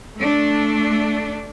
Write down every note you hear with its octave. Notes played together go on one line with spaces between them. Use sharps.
A3 D4